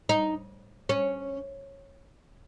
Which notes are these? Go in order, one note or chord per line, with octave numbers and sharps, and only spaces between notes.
D#4
C#4